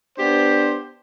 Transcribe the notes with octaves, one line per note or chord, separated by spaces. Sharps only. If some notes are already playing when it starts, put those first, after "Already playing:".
B3 D4 G4 C5